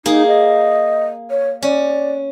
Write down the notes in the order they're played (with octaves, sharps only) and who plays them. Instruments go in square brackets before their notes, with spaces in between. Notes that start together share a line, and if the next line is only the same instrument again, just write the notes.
[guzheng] A#3 G#4 [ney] D#4
[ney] D#5
C#5
[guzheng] C#4 [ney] D5